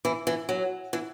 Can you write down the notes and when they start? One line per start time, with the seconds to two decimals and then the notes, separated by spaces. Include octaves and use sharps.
0.05 E3
0.27 E3
0.49 F#3
0.93 E3